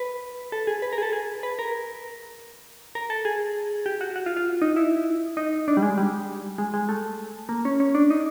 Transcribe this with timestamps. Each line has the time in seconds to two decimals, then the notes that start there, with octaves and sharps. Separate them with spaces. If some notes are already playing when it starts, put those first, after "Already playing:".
Already playing: B4
0.52 A4
0.67 G#4
0.82 B4
0.93 A#4
0.98 G#4
1.02 A4
1.13 G#4
1.43 B4
1.59 A#4
2.95 A#4
3.10 A4
3.25 G#4
3.86 G4
4.01 F#4
4.16 F#4
4.26 F4
4.37 F4
4.62 D#4
4.76 E4
5.37 D#4
5.68 D4
5.77 G3
5.82 G#3
5.98 G3
6.58 G#3
6.74 G#3
6.89 A3
7.49 A#3
7.65 C#4
7.80 C#4
7.95 D4
8.10 D#4